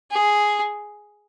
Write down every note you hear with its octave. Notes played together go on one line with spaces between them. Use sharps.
G#4